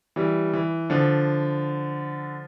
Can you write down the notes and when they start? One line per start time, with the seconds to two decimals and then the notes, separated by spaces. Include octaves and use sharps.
0.16 E3 G3
0.53 E3
0.90 D3 F3